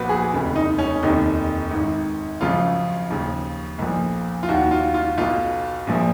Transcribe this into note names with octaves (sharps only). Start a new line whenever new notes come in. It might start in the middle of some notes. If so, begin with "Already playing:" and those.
Already playing: B1 A#2 F3 F#4 B4
G#4
F1 D#2 C#3
D#4
C#4
F1 D#2 D#3 D#4
G#1 G#2 D#3
G#1 F#2 C#3 F3 F4
D#2 C#3 F3
B1 A#2 F3
F4
D#2 D#3 F#4
F4
F4
B1 B2 F4
A#1 A#2 F3